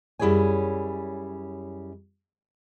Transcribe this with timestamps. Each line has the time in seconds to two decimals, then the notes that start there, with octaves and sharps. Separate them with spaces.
0.19 F#2 G3 E4 G#4 C#5 G#5